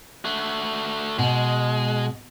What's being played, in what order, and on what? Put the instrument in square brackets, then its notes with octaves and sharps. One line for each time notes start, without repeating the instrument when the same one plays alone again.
[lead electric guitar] A3 F#4
[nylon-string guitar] B2 [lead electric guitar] G#3